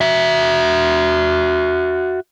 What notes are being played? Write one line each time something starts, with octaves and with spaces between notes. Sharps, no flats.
F#4 E5